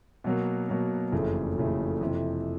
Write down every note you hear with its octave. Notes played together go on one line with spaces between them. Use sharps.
B2 F#3 A#3
B2 F#3 A#3
F#1 F2 C#3 E3 A3
F#1 F2 C#3 E3 A3
F2 C3 E3